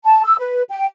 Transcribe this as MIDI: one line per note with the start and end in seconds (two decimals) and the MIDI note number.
0.05 0.23 81
0.25 0.36 88
0.39 0.62 71
0.69 0.85 79